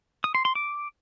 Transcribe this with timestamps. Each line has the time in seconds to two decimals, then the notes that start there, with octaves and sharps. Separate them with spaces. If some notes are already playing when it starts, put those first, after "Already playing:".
0.24 D#6
0.35 C6
0.45 C6
0.55 D6